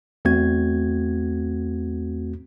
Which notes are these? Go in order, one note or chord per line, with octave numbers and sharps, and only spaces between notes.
E2 A3 C4 F#4 G#6